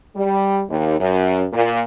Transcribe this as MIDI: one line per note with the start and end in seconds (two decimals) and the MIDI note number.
0.16 0.62 55
0.69 0.96 39
1.00 1.45 42
1.52 1.81 46